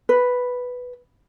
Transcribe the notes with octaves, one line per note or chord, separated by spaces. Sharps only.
B4